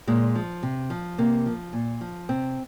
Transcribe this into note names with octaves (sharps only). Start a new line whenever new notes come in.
A#2 G#3
F3
C3
F3
C3 A#3
F3
A#2
F3
C3 C4